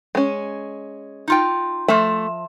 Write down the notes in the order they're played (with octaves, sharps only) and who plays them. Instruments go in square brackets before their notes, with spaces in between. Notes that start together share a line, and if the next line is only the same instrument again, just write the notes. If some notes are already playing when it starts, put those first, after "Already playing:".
[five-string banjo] G#3 C#4
[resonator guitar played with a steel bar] D#4 F4 G5
[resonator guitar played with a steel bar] F3 E5 [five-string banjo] A3